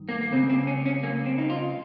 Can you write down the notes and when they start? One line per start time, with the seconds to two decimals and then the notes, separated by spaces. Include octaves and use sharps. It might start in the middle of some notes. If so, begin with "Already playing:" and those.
Already playing: G2 D#3
0.09 A#3
0.21 A#3
0.32 C#3 C4
0.36 C#2
0.49 C4
0.67 C#4
0.86 C#4
1.03 A#3
1.26 C4
1.38 D#4
1.50 F4